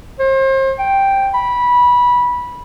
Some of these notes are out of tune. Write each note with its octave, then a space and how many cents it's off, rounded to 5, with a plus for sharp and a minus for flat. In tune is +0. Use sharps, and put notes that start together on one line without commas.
C5 +35
G5 +0
B5 -15